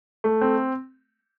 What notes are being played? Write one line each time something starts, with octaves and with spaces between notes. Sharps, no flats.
A3
C4